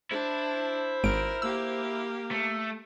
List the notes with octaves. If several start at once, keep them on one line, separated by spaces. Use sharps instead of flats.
D4 E4 C5
G#1 A#4 D7
A#3 G4 E6
A3